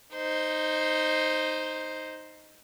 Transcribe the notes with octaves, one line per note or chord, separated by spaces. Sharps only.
D#4 C5